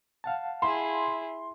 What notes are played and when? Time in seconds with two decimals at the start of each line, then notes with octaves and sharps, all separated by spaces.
0.24 F5 F#5 A5
0.62 E4 G#4 C6